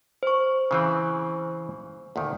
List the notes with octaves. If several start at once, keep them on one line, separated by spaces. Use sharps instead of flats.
C5 C#6
C#3 E3 C4
D2 A#2 D#3